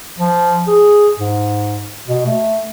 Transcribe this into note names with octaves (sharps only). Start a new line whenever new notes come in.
F3
G#4
G#2
B2
A3